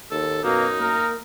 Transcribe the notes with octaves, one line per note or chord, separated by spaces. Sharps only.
D#2 A4
F#2 B2 A#3 D#4
A#3 A#4